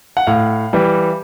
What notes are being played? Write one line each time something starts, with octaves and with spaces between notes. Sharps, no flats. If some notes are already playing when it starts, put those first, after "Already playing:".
F#5
A2 F5
E3 G3